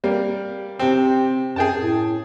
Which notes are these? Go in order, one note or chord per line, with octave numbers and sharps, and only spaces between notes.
G3 A#3
C3 C4 G4
F#2 G#4 G5 A5
A2